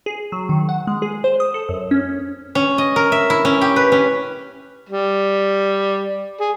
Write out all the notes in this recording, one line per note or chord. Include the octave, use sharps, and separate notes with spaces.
G#4
F#3
D#3
F#5
G#3
G#4
C5
D#6
A4
F#2
C#4
C#4
D#5
A#4
E5
E4
C#4
G4
B4
C#4
G3
G#4